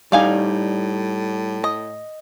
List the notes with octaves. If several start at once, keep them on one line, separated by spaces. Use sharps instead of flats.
A2 G3 D#4 D5 F5 G#5
D#5